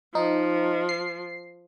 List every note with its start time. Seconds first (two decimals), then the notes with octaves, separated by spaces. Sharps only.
0.15 F3 D#4
0.89 C7